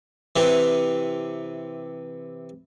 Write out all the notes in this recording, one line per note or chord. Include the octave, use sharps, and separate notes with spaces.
C3 E3